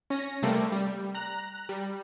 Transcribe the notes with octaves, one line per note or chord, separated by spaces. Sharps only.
C#4 A#6
C3 G3 A3 A#3
G3
A#5 F#6
G3